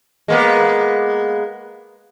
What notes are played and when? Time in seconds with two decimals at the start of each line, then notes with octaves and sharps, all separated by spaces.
0.28 G#3 A#3 B3